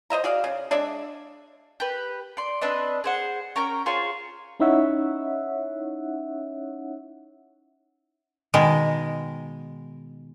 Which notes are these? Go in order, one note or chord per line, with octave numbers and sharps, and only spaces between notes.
C5 D#5 E5 A#5
F#4 G#4 D5 F5
C#3
G#3 D4 D5 E5
G4 B4
D5 C6
C4 D4 B4 D#5
G#4 C5 F#5
C#4 A#4 G5 A#5
F4 G#4 C5 C#5
C#4 D#4 E4 C#5 E5 F#5
B2 D#3 G#3 A#4